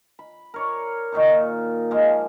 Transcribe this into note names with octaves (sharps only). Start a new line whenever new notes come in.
B5
A#4 C#5 D5
A#2 D#3 D#4 C#6
F3 G#3 A#3